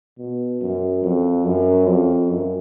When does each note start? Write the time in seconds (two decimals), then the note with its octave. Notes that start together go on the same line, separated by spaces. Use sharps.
0.19 B2
0.61 F#2
1.04 F2
1.45 F#2
1.87 F2
2.30 F#2